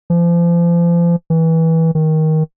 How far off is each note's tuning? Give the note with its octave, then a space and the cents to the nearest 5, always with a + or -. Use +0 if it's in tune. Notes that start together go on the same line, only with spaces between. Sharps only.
F3 -35
E3 -20
D#3 +15